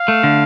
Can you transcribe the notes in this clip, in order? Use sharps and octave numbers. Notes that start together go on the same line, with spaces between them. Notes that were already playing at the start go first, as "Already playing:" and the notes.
Already playing: F5
A3
D3